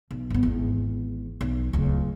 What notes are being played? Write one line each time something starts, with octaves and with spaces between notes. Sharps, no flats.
B1
G1 B3
G#1 E2
B1
D1 C#2